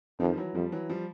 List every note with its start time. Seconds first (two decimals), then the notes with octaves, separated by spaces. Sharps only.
0.20 F2 D#3 F3
0.33 G3
0.37 E3 F#3
0.55 F2 F3 G3
0.72 E3 F#3
0.90 F3 G3